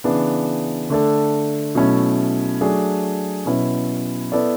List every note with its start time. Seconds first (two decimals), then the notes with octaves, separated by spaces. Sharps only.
0.04 C#3 E3 B3 D4
0.90 D3 A3 D4 A4
1.75 B2 F#3 A3 C#4 E4
2.61 F#3 A3 D4 G#4
3.46 B2 F#3 C#4 E4 B4
4.32 B3 E4 A4 D5